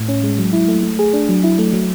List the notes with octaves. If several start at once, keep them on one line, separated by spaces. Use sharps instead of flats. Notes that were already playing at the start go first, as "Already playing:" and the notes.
Already playing: A2
C#4
G#3
F#3
E4
A3
A3
G#4
D4
F#3
E4
A3
F#3